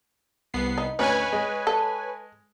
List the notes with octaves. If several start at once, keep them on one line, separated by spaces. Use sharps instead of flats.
C2 B3 C7
D#4
D2 C#4 B4 C#5 G#5
G#3
A4